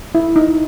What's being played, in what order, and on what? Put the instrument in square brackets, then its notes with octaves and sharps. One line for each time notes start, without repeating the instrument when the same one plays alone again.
[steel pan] E4
D#4